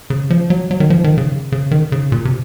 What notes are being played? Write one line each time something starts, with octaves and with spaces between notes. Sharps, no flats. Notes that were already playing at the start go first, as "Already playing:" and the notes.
C#3
F3
F#3
F#3
D#3
F3
D#3
C#3
C#3
D#3
C#3
A#2
C3